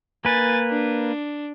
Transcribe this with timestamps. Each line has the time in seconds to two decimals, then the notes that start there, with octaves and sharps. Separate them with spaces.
0.25 A#3 B4 G#5 A6
0.70 D4